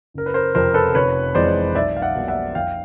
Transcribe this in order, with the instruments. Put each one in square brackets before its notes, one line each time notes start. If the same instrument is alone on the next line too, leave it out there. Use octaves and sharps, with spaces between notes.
[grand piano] F#1 A#4
B4
A#4 C5
F2 C3 A#4 C5
A4 B4
F1 B4 C#5
F2 C3 E3 G#3 C5 D5
B1 D5 E5
F5
E5 F#5
B2 G3 A#3
E5 F#5
F2 F5 G5